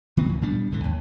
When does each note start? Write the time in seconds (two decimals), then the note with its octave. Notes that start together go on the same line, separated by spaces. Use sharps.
0.17 D#3 B3 C4
0.29 C#2
0.42 A#2 G3 B3 D4
0.71 C2 G#2 D3 E3
0.84 D#2